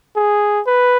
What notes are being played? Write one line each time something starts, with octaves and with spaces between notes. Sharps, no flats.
G#4
B4